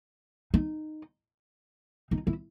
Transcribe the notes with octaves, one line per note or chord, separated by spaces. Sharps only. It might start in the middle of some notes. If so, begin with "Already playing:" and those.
D#4
D#4
E4